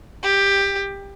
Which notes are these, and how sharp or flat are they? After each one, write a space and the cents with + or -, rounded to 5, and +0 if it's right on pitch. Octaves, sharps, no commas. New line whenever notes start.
G4 +15